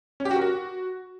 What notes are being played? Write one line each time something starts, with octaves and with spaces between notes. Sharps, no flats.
C#4
G4
F#4
A#4
F#4